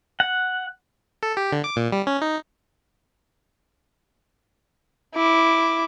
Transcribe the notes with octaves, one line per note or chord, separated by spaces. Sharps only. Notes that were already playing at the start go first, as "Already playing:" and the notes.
F#5
A4
G4
D3
D6
A#2
G3
C#4
D#4
E4 D6